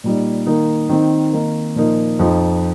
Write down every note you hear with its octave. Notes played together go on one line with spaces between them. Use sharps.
A#2 G3 D#4
D#3 A#3 D#4
D#3 C4 D#4
D#3 A#3 D#4
A#2 F3 A#3 D#4
F2 F3 D#4